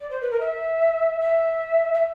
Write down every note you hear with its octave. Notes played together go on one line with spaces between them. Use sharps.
D5
C5
B4
A#4
E5
E5
E5